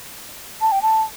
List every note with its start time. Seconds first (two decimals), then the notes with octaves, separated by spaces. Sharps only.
0.61 A5
0.72 G5
0.82 A5